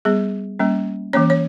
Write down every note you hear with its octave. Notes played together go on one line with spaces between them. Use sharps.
G3 B3 G#4
G3 A#3 C#4
E3 A#3 C#4 C#5
C#5